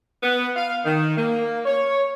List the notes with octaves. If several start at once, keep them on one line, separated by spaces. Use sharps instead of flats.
B3
F5
D#3
A#3
C#5